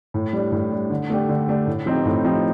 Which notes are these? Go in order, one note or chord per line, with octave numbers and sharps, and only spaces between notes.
A2
G3 D4
A2
G3 D4
D3
A3 D4 G4
D3
A3 D4 G4
A2
F3 C4 D#4 G4
A2
F3 C4 D#4 G4